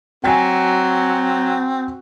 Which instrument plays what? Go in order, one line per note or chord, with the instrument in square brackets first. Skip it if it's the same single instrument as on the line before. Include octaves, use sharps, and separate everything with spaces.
[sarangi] F#3 [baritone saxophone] C4 [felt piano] G5 G#5